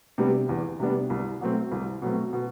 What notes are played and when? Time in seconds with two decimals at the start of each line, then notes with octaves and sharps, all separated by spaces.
0.18 C3 G3 B3 D4
0.49 E2
0.80 C3 G3 B3 D4
1.10 C2
1.41 B2 F#3 A3 C4
1.72 C2
2.02 B2 F#3 A3 C4
2.33 B2